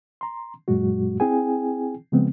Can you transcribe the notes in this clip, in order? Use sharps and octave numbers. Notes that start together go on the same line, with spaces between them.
A#5 C6
F#2 A#2 F#3 G#3 F#4
C4 E4 G#4 G5 G#5
C#3 F3 G#3 B3 C4